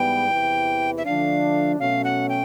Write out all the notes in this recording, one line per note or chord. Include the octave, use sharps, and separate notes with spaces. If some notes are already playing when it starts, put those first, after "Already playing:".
Already playing: G#2 E3 G3 B3 G5
E2 C3 E3
E5
D3 F3 A3 D4 F5
B2 F#3 A3 C#4 F5
F#5
G5